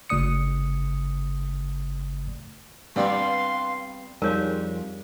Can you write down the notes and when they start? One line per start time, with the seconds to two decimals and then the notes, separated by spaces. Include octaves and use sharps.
0.10 G1 C#3 A3 D5 D#6 C#7
2.96 G2 G3 B3 C4 D5 F5 C6
4.22 F2 G3 D#4 G#4 A#4 C#5 F5